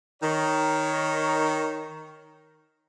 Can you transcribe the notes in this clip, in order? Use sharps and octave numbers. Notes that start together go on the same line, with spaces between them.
D#3 C#5